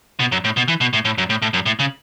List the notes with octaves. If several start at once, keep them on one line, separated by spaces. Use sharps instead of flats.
B2
F#2
A2
B2
E3
B2
A2
A2
F#2
A2
A2
F#2
A2
C#3